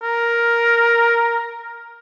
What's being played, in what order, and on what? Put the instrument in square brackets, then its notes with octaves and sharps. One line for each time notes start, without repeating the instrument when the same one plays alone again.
[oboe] A#4